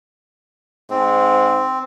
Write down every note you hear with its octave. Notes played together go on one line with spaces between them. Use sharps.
G#2 C4